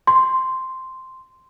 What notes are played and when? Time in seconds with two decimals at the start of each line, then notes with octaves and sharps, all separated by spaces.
0.07 C6